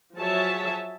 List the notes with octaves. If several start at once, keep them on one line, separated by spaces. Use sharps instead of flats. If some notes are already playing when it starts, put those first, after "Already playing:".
F3 F#3 G#4 C#5 E5 A5